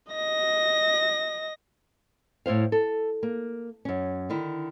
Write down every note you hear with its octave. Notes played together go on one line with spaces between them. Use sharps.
D#5 A#6
A2 E4 C5 F5
A4
A#3
F#2 C#4
D3 D#3 E4